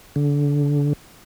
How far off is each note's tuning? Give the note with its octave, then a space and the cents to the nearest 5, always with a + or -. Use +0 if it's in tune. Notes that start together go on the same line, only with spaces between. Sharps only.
D3 -25